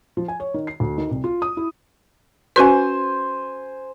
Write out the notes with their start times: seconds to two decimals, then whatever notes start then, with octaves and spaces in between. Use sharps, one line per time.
0.17 F3
0.28 G#5
0.40 C#5
0.54 D#3
0.67 C7
0.80 D2
0.98 D#3
1.11 C2
1.24 F4
1.42 D#6
1.57 E4
2.56 C#4 F#4 B4 C5 G#5